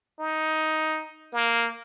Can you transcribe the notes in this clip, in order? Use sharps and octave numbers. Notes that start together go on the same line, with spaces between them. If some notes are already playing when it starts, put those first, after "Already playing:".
D#4
A#3